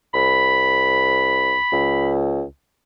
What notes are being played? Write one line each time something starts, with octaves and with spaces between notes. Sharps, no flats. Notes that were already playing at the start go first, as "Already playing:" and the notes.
C2 B5
C#2